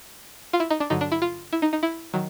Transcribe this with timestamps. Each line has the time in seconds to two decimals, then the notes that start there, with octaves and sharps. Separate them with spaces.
0.53 F4
0.60 E4
0.71 D#4
0.80 D4
0.90 G2 D3 F#3 D#4
1.01 D4
1.12 E4
1.22 F4
1.53 E4
1.62 D#4
1.73 D#4
1.83 E4
2.14 D#3 F#3